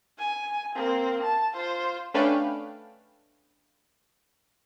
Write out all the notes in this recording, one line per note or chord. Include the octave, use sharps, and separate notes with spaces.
G#5
A#3 C4
A5
F4 C5
A3 C#4 D4 B4 F5 G5